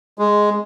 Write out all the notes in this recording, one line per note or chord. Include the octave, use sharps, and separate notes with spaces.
G#3